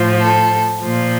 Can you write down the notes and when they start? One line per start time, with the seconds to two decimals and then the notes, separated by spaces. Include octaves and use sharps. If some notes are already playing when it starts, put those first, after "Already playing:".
Already playing: A2 F3
0.20 A4
0.83 A#2 F3